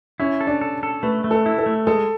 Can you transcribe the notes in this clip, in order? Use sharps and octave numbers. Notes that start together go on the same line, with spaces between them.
C#4 E4
A4
D4
A4
A4
A3 B4
A3
A4
E4
A4
A3
G#3 A4